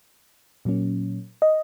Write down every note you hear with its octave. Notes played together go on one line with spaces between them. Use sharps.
A#2 F#3 A#3 C#4
D#5